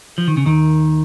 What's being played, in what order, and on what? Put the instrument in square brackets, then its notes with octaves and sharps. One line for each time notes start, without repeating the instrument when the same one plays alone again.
[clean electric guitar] F3
D#3
C#3
D#2 D#3